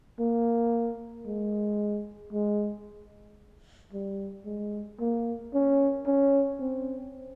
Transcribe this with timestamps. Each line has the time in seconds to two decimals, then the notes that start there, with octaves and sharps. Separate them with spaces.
0.19 A#3
1.26 G#3
2.33 G#3
3.93 G3
4.46 G#3
5.00 A#3
5.54 C#4
6.06 C#4
6.60 C4